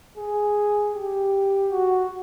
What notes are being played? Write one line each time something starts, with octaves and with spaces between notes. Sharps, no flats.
G#4
G4
F#4